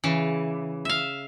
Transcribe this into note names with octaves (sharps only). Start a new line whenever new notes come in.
C#3 E3
E5 F5